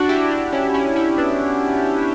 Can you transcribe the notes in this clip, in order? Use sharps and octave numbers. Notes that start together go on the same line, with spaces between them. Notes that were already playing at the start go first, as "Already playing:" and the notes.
Already playing: D4 F#4
E4 G4
D4 F#4
C#4 E4
C#4 E4
C#4 E4
B3 D4